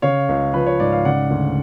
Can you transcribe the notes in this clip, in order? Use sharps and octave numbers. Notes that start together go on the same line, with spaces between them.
C#3 C#5 F5
C#2
F3 B4
C#5
G#2 D5
F5
C#3 D5 F#5
D2